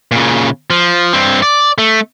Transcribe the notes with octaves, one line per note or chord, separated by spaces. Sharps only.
A#2 C#3
F3
G2 C4
D5
A3